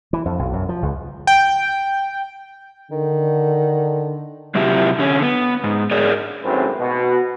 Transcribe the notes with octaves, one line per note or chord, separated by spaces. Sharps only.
E3
F2
B1
F#2
F3
C#2
G5
D3 D#3
C3 F#3 C4 E4 F4 G4
D3 C#4
B3
G#2
G#4 A#4 C#5 D5
G#1 F#2 A2 C4 B4
B2